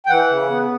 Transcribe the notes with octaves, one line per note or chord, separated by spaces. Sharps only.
G5
E3 F#5
C#3
B3